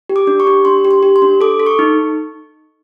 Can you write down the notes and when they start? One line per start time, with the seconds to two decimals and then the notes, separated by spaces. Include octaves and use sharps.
0.09 G4
0.16 D6
0.27 D4
0.40 C#6
0.47 G4
0.65 D4 C6
0.85 G4
0.91 C6
1.03 G4
1.16 C6
1.22 D4
1.41 A4 D6
1.60 A4
1.66 C#6
1.79 D#4